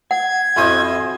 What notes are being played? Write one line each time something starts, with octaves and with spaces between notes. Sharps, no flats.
F#5 G#6
F2 C#4 E4 F#4 C5 D#5